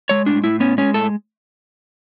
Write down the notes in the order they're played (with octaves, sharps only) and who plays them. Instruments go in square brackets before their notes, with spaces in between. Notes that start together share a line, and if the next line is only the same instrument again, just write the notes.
[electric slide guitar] G#3 C#5
A2 D4
A2 E4
B3 C#4
G#3 C#4
A2 A4